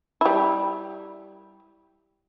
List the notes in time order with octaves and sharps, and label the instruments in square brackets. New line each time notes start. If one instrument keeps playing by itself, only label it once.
[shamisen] G3 E4